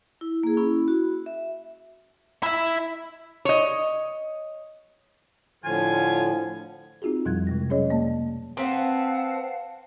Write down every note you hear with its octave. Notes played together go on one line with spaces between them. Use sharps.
E4
A#3 G#4
C#4 E4 B5
F#4
E5
E4 E5
C#5 D#5
A2 D3 F3 C#4 F4 G#5
C4 D#4 F4 F#4 G#4
F2 B2 F3 G3 F#6 G#6
C3 G#3 A#6
F#3 C#4 G#4 C#5 D#5
F2 A3 A#3 D5 A5
B3 C4 F5 F#5 A5